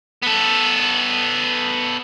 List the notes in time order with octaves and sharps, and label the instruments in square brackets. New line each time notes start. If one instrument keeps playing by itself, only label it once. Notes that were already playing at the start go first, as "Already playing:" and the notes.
[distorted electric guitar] B3 A4